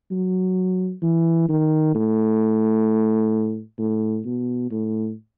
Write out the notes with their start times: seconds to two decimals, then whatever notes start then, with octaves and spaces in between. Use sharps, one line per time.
0.11 F#3
1.02 E3
1.49 D#3
1.95 A2
3.79 A2
4.25 B2
4.71 A2